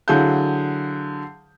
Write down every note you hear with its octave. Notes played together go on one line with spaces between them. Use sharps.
D3 F#3 E4 G#4 F5 G6